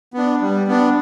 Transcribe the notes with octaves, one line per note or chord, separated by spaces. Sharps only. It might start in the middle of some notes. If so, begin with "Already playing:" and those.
B3 D4
G3
B3 D4